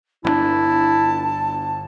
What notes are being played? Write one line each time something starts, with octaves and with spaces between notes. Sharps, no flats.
G1 C#3 D4 E4 A5